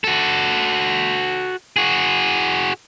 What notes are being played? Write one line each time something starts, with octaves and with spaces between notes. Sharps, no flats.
F#4 A4
F#4 G#4